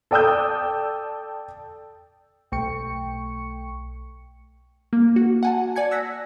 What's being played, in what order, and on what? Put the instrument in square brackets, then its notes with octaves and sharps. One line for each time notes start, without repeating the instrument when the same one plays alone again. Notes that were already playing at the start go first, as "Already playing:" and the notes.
[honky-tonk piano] A4 D5 G5 D#6 E6 G6
[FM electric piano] B1 A3 G5 C#6 C#7
[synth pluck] A#3
F#4
F#5 G#5 A5
D5 G#5 G#6 C#7
E6 F#6 A#6 B6